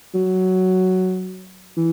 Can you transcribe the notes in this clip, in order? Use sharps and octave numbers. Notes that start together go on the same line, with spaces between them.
F#3
E3